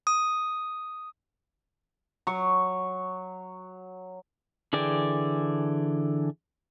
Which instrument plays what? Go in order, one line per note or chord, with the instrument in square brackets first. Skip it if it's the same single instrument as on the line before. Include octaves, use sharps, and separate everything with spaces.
[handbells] D#6
[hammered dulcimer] F#3 C#6
[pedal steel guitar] D3 E3 G#4 D5 G5